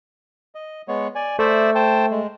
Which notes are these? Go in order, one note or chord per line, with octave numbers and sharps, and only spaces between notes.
D#5
G#3 B3 C#5
D5 G#5
A3 C5 D5 E5
C5 G5 A5
G#3